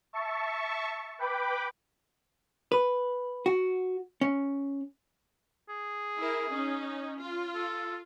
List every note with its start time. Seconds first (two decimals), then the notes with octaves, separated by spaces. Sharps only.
0.13 E5 A5 C#6
1.19 B4 G5 B5 D6
2.72 B4
3.46 F#4
4.21 C#4
5.69 G#4
6.18 E4 A#4
6.51 C#4 D#4
7.20 F4
7.55 A4